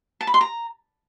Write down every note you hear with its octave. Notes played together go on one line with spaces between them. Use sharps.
A5
B5
C6
A#5